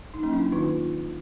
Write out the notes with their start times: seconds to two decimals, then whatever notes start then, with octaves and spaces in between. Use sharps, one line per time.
0.14 D#4
0.23 F#3 A#3 C#4
0.33 D4 E4
0.52 D#3 D#4 F4